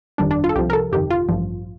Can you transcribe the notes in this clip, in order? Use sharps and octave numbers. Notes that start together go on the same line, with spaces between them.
G1 F2 D#3 G3 D4
D4
F4
A4
C2 C3 F3 G4
A#4
A4
G1 F2 C3 D#3 G4
F4
A1 G2 F3